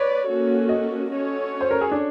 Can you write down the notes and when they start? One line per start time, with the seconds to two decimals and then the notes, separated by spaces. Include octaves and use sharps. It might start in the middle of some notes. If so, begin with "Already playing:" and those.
Already playing: B4 C#5 D5
0.28 A#3 C#4 F#4 A4
0.69 D#5
1.10 C#4 F#4 A4 C#5
1.61 C5
1.71 A#4
1.81 G#4
1.92 D4